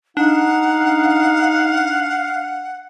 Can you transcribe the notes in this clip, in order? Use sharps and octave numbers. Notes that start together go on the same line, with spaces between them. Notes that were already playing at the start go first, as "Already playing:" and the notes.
D4 D#4 F5 F#5